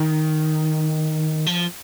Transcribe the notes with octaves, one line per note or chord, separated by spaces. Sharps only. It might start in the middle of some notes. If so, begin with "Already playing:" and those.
Already playing: D#3
F3